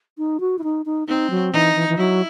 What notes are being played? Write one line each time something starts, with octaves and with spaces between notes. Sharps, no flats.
D#4
F#4
E4
D#4
D#4
C4 D#4
F#3
E3 D#4
E3
E3
F#3 E4